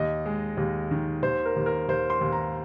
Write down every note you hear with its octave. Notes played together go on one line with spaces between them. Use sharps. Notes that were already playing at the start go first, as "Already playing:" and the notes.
Already playing: D#2 D#5
G#3
D#2
D#3
D#2 C5
A#4
D#2
A#4
D#2 C5
C6
D#2
A#5